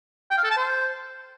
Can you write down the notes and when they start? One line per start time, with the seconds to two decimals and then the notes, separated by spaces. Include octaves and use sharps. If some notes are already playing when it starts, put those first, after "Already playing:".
0.31 G5
0.37 F5
0.44 A4
0.51 A5
0.57 C5